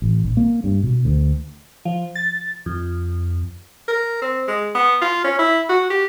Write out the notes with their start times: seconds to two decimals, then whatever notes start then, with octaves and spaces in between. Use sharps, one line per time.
0.02 A1
0.24 A#1
0.37 A#3
0.64 G2
0.83 B2
1.05 D2
1.85 F3
2.16 A6
2.66 F2
3.88 A#4
4.22 C4
4.48 G#3
4.75 B3
5.02 F4
5.24 C#4
5.39 E4
5.69 F#4
5.90 G4